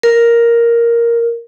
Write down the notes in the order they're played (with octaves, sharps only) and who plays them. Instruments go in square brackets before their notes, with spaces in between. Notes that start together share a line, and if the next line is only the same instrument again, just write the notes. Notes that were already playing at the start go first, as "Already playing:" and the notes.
[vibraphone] A#4